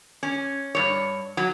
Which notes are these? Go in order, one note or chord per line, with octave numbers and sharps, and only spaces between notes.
C#4
G2 C#5
F#3